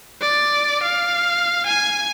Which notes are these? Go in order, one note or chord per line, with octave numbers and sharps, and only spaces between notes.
D5
F5
G#5